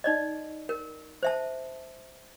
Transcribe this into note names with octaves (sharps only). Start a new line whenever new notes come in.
D#4 D5 D#5
A#4
C5 E5 A5